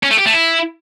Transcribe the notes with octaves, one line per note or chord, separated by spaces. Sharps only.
C#4
A3
G4
A3
E4